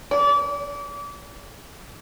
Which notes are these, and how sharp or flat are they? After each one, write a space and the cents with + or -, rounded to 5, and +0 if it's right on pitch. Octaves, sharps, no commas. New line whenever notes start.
D5 -35